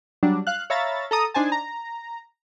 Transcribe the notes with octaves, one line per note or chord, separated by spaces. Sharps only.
F#3 G3 D4
F5 F#6
C#5 E5 F5 A#5 B5 A6
A4 A#5 D#6
D4 D#4 C5 G#5 A5
A#5